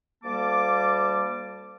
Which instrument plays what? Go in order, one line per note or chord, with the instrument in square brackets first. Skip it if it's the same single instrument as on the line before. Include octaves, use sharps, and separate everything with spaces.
[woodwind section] D2 G3 A#3 A5 D6